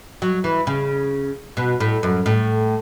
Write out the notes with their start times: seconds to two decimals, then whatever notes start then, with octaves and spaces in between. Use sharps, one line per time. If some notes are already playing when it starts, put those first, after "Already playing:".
0.22 F#3
0.44 E3
0.67 C#3
1.57 B2
1.80 A2
2.03 F#2
2.26 A2